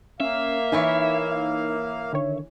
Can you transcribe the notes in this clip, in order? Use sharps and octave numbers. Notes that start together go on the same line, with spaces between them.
A#3 C#4 E5 F5
E3 D#4 E4 C#5
D3 D#3 C#5